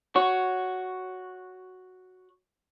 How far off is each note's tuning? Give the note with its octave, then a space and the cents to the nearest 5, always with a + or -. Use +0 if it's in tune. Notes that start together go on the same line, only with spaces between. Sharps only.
F#4 +0 C#5 +5